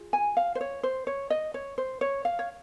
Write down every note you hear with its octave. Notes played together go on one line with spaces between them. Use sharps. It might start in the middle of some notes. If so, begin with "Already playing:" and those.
Already playing: F4 G#4
G#5
F5
C5
C#5
C5
C#5
D#5
C#5
C5
C#5
F5
C#5